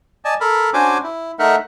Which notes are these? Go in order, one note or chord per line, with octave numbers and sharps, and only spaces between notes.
D5 D#5 G#5 A5
A4 A#4 B5
C#4 D4 F#4 C5 G#5 D6
E4
A3 D#4 A#4 E5 F#5